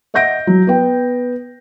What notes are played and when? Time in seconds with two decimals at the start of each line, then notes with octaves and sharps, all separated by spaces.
0.14 D#5 E5 F#5 G6 A#6 D7
0.47 F#3
0.67 B3 G5